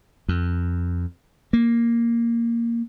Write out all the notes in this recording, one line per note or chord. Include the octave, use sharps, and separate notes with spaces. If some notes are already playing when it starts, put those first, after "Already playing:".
F2
A#3